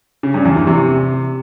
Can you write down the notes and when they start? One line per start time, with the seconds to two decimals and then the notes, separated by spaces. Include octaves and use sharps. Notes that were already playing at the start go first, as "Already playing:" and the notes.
0.23 C#3
0.34 G2
0.45 E2
0.56 E3
0.67 C3